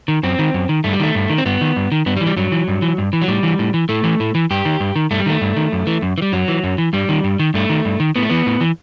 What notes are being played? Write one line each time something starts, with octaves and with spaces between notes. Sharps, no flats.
D#3
F#2 C4
D#3
F#2
D#3
G2 A3
G3
D#3 A3
G2
D#3
C4
G2 B3
D#3
G2
D#3
G2 B3
G3
E3
G3
G2 F#3
E3
G2
E3
G2
E3
F#3
A2 G3
E3
A2
E3
A2 A3
E3
A2
E3
G2 G4
D#3
G2
D#3
G2 A3
G3
D#3 A3
G2
D#3
F#2
E3
F#2
E3
G3
F#2 F#3
E3
F#2
E3
G2 G3
D#3
G2
D#3
G2 A3
D#3
G2
D#3
A2 B3
A3
E3 B3
A2
E3